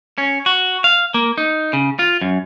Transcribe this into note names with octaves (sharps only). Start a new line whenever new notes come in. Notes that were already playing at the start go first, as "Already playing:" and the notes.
C#4
F#4
F5
A#3
D#4
C#3
F4
F#2